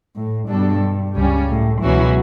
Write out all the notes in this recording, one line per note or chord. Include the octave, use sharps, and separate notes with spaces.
A2
G2 B2 G3 D4 A4
C#2 C#3 G3 C#4
A2
C#2 B2 E3 F#3 C#4 F#4